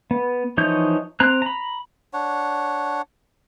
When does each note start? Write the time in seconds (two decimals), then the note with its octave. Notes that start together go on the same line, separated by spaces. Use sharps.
0.11 B3
0.57 E3 F3 D#4 C#5 G6
1.20 C4 A#5 F#6
1.42 A#5 B5
2.13 D4 C#5 F#5